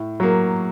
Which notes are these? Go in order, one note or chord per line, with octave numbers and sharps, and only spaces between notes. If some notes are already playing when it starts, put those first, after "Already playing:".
Already playing: A2
F#3 A#3